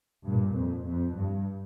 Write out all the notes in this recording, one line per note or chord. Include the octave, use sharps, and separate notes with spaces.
G2 A#2
F2
F2
G2